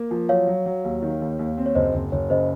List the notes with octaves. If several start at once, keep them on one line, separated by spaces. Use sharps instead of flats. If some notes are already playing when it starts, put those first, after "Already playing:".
Already playing: A#3
F3
F#3 C#5 F5
F#3
F#3
D#2
D#3
D#2
D#2
C4
C#5
F#1 C5 D#5
F#1
F#1 C#5
C#3 C5 D#5